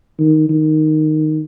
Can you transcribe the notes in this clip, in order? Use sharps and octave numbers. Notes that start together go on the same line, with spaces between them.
D#3
D#3